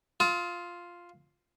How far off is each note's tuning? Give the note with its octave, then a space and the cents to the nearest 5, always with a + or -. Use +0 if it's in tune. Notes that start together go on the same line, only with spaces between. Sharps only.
F4 +0 D#6 +45